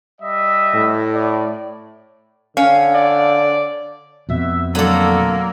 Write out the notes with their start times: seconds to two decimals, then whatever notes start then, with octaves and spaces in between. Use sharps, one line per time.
0.21 G3 D#5 E5
0.75 A2
1.13 D5
2.57 D3 C#4 F5
2.94 D5
4.29 F2 B2 E5
4.75 D3 F#3 A3 A#3 A4